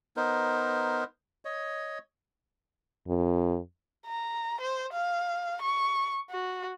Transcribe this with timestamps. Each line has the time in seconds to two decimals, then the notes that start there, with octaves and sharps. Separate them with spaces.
0.17 B3 D#4 A#4 C5
1.45 C#5 D#5
3.08 F2
4.06 A#5
4.61 C5
4.93 F5
5.62 C#6
6.31 F#4